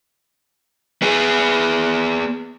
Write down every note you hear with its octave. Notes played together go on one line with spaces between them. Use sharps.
B3 G#4